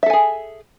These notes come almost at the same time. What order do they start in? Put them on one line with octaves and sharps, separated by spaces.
E5 A4 G#5 G#4